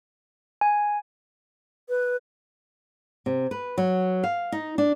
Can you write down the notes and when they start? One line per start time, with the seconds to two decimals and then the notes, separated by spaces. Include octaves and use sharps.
0.61 G#5
1.89 B4
3.26 C3
3.51 B4
3.78 F#3
4.24 F5
4.52 D#4
4.78 D4